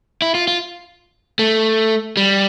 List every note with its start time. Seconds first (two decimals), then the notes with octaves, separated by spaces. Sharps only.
0.22 E4
0.35 F4
0.48 F4
1.39 A3
2.17 G3